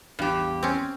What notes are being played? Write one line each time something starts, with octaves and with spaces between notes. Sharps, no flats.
A1 E2 G2 G4
C4 C#4